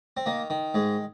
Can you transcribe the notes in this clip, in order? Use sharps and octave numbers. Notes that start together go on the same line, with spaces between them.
C4
D#3 A#3
D#3
G#2 G#3